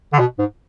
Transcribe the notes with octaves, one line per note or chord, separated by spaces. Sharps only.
D3
B2
G#2